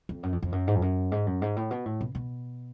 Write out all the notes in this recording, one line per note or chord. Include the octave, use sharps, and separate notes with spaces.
F2
F#2
F2
F2
F#2
G#2
F2
F#2
G#2
F#2
G#2
A2
B2
A2
B2
B2